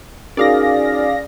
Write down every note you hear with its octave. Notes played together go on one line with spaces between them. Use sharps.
C#4 D#4 F#4 G#4 A#4 D5 F5 A#6